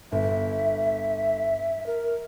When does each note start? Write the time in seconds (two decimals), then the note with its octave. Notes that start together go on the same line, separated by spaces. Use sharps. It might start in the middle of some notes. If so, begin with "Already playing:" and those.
0.12 G1 E5
1.86 A#4